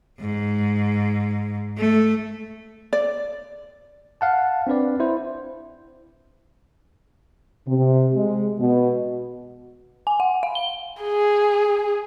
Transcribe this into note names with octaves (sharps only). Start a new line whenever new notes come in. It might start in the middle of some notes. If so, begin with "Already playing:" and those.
G#2
A3
D5
F5 F#5 A5
C4 D4 B4 D5
E4 C5
C3
G#3
B2
G#5
F#5
F5
G7
G#4